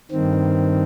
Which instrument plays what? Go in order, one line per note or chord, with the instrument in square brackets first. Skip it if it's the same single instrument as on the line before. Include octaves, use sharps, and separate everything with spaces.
[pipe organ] G2 D#3 C4